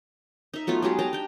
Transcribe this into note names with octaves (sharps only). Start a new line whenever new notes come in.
D#4 E5
F#3 A3 B3 F4
F#3 G#3 G4 G#4
D#5 G5 A5 A#5
D4 G5